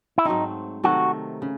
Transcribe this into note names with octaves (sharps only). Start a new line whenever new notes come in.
E4
G#2 F#3 A3 C4 D#4
C3 D#3 F#3 A3 F#4
C#3